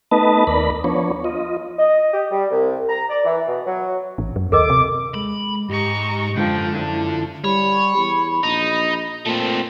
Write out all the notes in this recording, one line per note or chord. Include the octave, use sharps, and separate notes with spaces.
A3 B3 D#4 B4 D#5 A5
D#2 A#4 D5 B5
F3 B3 D4 C#5
F4 D#5
D#5
G4
G3
C2
A#5
D5
E3
B2
F#3
A1
F#2
D#2 A4 A#4 D#5 D6
C3
G#3 B5
G#2 G4 D#5 A#5 C#6
F#2 D3 F3 G#3 G5
F#2 F3 D4 E4
G3 C#5 B5
E2
A#1 D#4
A#2 A3 C4